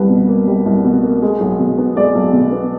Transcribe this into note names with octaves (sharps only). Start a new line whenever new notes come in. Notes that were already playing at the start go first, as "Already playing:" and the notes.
Already playing: C2 G3 B4
B2
A#3
G3
C2
B2
A#3
G#3
B1
B2
B3
G#3 D5
B1
B2
B3